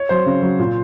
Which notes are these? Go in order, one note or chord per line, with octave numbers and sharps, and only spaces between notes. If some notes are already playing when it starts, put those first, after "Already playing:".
Already playing: C#5
F#3 C5
C#3
F#3
A#2